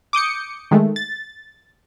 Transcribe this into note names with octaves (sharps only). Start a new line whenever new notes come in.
D6 D#6 G6 C#7
D#3 G#3 A3
A6